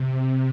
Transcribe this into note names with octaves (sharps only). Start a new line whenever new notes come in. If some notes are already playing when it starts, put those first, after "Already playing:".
Already playing: C3